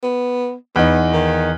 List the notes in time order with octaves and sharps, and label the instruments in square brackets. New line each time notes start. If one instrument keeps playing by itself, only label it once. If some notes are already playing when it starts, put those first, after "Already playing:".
[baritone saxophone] B3
[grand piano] E2 D#4 [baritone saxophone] B3
[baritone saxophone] D#3